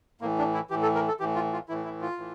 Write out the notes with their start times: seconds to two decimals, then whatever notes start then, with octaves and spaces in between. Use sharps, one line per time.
0.21 A2 E3 A#3
0.39 D4
0.54 E4
0.70 A2 E3 G4
0.83 A4
0.95 A#4
1.08 A4
1.20 A2 E3 G4
1.35 F4
1.53 F4
1.68 A2 E3 E4
1.85 E4
2.01 F4
2.18 A2 E3